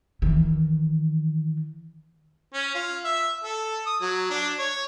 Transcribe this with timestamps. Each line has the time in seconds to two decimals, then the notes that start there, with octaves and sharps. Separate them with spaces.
0.22 D#3 E3
2.54 C#4
2.75 F4
3.04 E5
3.44 A4
3.86 D#6
4.01 F#3
4.30 D4
4.59 C#5